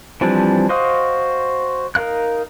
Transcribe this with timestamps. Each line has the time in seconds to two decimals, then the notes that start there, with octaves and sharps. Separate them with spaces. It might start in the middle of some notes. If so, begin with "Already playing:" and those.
0.21 E3 F3 G3 C4 D4
0.69 F#4 C5 D#5 F5 D#6
1.95 D#4 A#4 F5 F#6